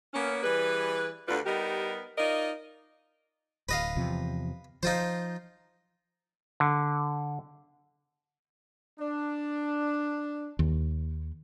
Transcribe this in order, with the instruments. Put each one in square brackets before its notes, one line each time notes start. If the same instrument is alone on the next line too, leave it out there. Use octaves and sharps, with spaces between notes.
[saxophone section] A#3 B3 C#4
E3 G3 G#4 B4
D2 D3 G3 F4 B4
G3 B3 D#4 G4 A#4
D#4 F4 A#4 D5 D#5
[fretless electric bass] D1 [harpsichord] B4 D#5 F5
[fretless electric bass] E2 C3 F3
[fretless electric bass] F3 [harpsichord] D#4 F4 C5
[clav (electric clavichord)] D3
[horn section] D4
[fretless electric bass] D#2